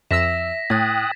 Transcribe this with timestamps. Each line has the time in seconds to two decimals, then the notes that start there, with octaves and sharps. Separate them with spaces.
0.11 F2 E5 E6 A#6 B6 E7
0.70 A2 G5 D#6 F#6 G#6 A6